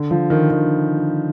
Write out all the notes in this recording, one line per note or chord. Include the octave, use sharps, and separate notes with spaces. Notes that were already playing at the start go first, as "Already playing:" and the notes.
Already playing: D3
F3
D#3
D#3